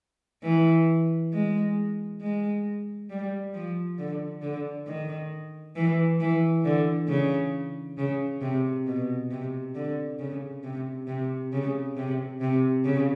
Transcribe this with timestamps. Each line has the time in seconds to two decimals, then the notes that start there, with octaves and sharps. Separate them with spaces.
0.43 E3
1.33 G#3
2.21 G#3
3.10 G3
3.54 F3
3.98 D3
4.42 D3
4.87 D#3
5.76 E3
6.20 E3
6.64 D3
7.09 C#3
7.98 C#3
8.42 C3
8.86 B2
9.31 C3
9.75 D3
10.19 C#3
10.64 C3
11.07 C3
11.53 C#3
11.96 C3
12.41 C3
12.85 C#3